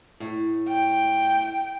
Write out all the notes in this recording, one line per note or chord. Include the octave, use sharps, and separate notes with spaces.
A2
G5